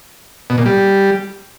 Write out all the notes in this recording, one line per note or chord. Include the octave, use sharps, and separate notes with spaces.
B2
A#2
G3